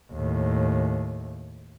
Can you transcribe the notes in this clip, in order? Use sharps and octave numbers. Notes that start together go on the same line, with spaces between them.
D#2 A2